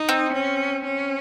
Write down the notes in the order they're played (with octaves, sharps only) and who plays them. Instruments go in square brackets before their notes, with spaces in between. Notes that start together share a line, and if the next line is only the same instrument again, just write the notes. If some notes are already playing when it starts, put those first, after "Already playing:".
Already playing: [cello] D#4
[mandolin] C4
[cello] C#4
C#4